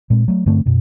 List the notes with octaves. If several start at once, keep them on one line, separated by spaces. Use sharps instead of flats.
A#2 G#3 C4
F#3 A3
G2 D3 A3 C4
F#2 B2